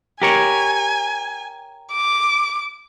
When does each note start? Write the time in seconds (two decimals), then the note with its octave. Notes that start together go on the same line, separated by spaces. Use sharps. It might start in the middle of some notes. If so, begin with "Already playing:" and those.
0.22 G4 A#4 C#5 G#5
1.92 D6